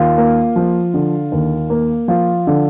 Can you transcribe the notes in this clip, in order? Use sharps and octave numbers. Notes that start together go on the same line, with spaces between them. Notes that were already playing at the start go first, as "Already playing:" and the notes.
Already playing: D#2 F4
A#3
F3
D3
D#2
A#3
F3 F4
D3